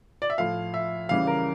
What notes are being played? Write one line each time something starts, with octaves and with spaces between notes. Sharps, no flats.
D5
E5
A2 F3 F5
E5
C#3 E3 G3 F5
A#4